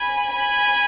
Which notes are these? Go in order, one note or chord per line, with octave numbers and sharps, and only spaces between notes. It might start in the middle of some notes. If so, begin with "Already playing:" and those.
Already playing: G#5 B5
G#5 B5